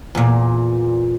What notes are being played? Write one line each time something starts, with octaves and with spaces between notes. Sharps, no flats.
E2 A#2